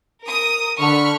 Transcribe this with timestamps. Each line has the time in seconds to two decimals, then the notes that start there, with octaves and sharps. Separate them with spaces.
0.25 A#4 D#6
0.79 D3 B5 C#6 F6